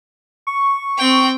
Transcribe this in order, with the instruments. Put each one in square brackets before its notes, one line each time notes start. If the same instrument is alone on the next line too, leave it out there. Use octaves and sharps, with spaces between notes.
[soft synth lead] C#6
[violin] C4 G5